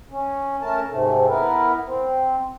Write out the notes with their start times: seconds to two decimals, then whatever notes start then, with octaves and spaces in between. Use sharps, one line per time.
0.11 C#4
0.62 A3 C#4 A#4 A5
0.88 G#2 C3 A3
1.28 B3 E4 A#4 B4
1.86 C4